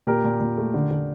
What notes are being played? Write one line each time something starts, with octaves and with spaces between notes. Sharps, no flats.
A#2 G4 A#4
A#2
A#2
A3
D3
D3